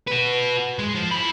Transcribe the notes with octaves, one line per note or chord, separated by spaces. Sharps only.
F#4 B4
G#3
F3
E3 B5